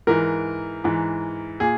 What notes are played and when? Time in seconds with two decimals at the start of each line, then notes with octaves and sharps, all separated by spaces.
0.07 G#2 E3 A#4
0.84 G#2 E3
1.60 A#2 G#4